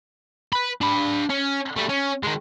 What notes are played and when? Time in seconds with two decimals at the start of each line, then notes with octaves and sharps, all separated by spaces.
0.53 B4 B5
0.81 D4 B5
1.30 C#4
1.76 G3 A3
1.89 C#4
2.24 D#3 G#3